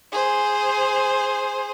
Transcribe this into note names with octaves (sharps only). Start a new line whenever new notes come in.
G#4 C5